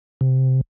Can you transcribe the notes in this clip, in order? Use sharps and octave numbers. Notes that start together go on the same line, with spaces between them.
C3